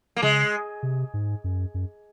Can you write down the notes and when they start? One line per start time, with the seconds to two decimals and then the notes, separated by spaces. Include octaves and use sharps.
0.16 A#3
0.22 C#3 G#3
0.83 C3
1.14 G#2
1.44 F#2
1.74 F#2